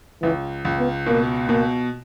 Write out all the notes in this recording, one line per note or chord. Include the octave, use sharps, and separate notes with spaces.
C#2 E3
C#2
B3
B2 A#3
B2 A#3